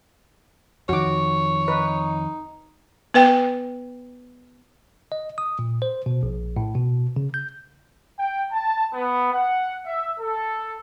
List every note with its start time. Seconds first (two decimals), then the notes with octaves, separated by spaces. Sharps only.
0.89 F2 D#3 F#4 C#5 D6
1.68 D#4 B4
3.14 B3 B4 G5
5.12 D#5
5.38 D#6
5.59 A#2
5.82 C5
6.06 B2
6.23 A#1
6.57 A2
6.75 B2
7.16 C#3
7.34 G6
8.18 G5
8.51 A5
8.93 B3
9.33 F#5
9.86 E5
10.19 A4